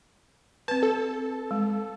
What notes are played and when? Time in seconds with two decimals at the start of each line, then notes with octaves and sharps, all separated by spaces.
0.68 C4 B4 A5
0.83 A4
1.51 G#3